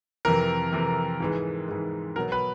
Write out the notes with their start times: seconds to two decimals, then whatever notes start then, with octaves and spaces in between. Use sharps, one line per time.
0.25 F2 C3 E3 A#4
0.72 F2 C3 E3
1.20 G#2 E3 G#3
1.68 G#2 E3 G#3
2.16 B2 F#3 A#4
2.32 B4